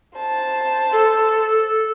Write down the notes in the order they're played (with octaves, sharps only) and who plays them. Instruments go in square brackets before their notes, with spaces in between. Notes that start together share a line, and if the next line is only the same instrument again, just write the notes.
[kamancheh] C5 A5
[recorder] A4